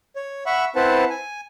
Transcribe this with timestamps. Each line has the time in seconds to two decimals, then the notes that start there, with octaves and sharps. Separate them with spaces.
0.16 C#5
0.46 E5 F#5 B5 C#6
0.76 C4 E4 B4 C5 F#5 A5
1.10 G#5